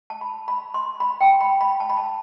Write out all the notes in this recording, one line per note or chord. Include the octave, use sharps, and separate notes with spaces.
A5
B5
B5
C6
B5
G5
B5
B5
A5
B5
A5